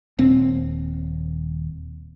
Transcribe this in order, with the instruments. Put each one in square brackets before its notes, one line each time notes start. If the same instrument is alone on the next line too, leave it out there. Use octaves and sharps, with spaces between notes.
[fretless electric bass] D#1 C4